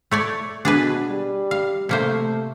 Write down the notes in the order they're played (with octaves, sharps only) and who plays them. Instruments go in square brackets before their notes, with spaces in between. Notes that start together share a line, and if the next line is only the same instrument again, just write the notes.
[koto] A3 C#5 D5
[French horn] B2 [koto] D4 G#4 B4
[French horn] G3
[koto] F5
[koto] C3 A#3 C5 [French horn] A3